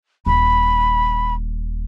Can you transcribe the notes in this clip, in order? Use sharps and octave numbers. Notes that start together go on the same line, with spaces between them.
D#1 B5